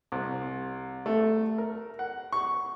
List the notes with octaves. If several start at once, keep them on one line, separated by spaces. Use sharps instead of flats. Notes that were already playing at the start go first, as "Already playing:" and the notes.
C2
A3
A#4
F#5
C#6